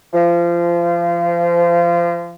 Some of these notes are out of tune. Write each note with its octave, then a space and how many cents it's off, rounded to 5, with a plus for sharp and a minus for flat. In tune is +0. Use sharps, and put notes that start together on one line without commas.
F3 -25